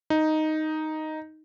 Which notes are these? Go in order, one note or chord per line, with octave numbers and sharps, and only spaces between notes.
D#4